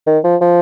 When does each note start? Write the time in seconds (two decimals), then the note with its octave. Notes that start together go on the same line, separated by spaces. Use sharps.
0.07 D#3
0.24 F3
0.41 F3